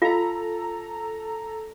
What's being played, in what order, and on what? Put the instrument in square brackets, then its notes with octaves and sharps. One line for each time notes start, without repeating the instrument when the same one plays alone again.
[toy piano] F4 F5 [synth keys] A4 A#5